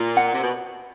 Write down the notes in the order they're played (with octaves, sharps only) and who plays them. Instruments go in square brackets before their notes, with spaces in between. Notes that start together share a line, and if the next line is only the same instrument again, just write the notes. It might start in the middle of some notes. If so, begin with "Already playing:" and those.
Already playing: [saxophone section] A#2
[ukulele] F#5
[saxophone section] C3
B2